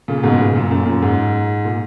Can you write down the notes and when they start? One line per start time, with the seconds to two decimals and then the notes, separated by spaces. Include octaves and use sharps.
0.08 A#2 C#3
0.23 G#2 B2
0.39 A#2 C#3
0.55 F#2 A#2
0.70 F#2 A#2
0.86 F#2 A#2
1.02 G#2
1.65 A#2